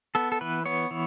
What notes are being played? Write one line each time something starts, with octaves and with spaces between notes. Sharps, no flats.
B3 A4
A4
E3 B4
B3 C#5
E3